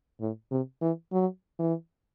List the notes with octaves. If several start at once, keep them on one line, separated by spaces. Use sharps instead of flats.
A2
C3
E3
F#3
E3